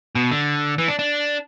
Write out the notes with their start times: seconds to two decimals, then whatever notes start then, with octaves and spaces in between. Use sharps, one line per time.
0.15 B2
0.31 D3
0.78 E3
0.88 D4
0.99 D4